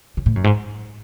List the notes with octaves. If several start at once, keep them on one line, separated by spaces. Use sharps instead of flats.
C#3
A2
F#2
G#2